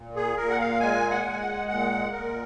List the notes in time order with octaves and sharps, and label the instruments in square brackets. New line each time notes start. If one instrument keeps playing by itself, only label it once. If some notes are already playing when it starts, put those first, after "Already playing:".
Already playing: [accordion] A#2
G#4
A#2 A#4
F#5
F5
G#3 G#5
F#5
G#3
G#5
F#5
A#2 F#5
A#2 A#4